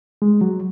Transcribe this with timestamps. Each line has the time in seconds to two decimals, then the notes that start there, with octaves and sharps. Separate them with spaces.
0.22 G#3
0.41 F#3